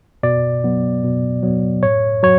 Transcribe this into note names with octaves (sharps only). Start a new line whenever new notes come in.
B2 D5
F#3 B3
B2
F#3 B3
A2 C#5
F#3 C#5